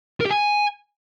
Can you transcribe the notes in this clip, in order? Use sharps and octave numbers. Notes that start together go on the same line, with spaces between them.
A#4
G4
G#5